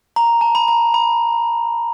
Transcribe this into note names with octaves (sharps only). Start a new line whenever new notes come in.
A#5
A5
B5
A#5
B5